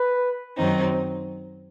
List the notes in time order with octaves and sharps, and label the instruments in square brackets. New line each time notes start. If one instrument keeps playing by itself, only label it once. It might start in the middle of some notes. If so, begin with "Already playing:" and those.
Already playing: [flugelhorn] B4
[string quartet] F#2 D#3 F#3 C4 D#4